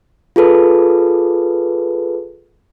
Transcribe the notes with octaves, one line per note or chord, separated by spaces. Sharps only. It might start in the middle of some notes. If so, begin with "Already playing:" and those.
F4 G#4 A4 B4